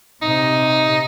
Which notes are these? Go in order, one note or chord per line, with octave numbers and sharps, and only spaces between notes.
C3 D#4